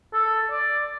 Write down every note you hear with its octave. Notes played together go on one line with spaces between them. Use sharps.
A4
D5